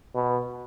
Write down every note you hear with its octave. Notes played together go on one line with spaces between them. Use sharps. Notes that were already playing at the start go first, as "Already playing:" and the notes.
B2